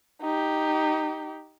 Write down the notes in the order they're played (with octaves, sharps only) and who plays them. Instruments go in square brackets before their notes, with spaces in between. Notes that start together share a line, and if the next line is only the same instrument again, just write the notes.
[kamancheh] D#4 G4